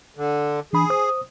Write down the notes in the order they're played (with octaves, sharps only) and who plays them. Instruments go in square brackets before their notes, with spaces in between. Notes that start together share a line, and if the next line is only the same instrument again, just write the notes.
[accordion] D3
[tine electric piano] E3 D4 B5 [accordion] G#4
[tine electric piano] C5 D#6